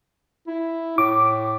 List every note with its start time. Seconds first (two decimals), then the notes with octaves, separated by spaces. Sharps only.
0.47 E4
0.98 A2 D6